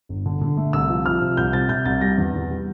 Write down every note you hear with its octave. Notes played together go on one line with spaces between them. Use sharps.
G1
D3
D3
A3
C2 E6
F3
F3 F6
C3
C2 G6
C3 A6
C3 G6
C2 A6
G3 A#6
E2
E2
G3